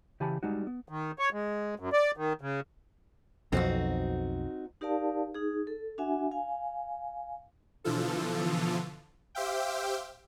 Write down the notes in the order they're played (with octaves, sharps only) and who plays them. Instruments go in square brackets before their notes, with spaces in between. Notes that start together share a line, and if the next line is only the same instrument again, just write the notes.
[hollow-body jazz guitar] C#3 E3 G4 G#5 A5 B5
G3 G#3 D#4 F#4
B3
[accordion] D#3
C#5
G#3
F#2
D5
D#3
C#3
[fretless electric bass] B1 F2 [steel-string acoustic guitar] C4 D#4 F#4
[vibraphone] D#4 G4 A#4 D5 F5 A5
D#4 G#4
A4
D4 F#4 E5 F#5 G#5
F5 G#5
[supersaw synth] B2 D3 E3 F3 F4 A4
G4 C5 E5 F5 G5